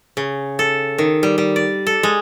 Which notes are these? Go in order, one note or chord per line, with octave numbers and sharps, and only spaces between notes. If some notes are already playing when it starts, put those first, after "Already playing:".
C#3
A4
D#3
G3
G3
D5
A4
G#3